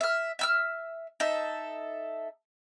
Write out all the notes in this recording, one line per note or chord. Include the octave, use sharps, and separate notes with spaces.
E5 F6
E5 E6 F6
D#4 A4 E5